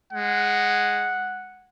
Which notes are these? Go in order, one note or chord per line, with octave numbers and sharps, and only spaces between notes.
G#3 F#5